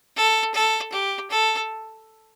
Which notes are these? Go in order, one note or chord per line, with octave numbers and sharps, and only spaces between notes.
A4
A4
G4
A4